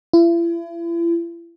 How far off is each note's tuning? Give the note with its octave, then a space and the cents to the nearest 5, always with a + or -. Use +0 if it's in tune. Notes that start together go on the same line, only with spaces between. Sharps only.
E4 +40